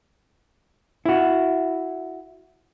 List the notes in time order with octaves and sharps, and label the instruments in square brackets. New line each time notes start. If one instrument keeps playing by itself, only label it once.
[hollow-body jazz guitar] E4 F#4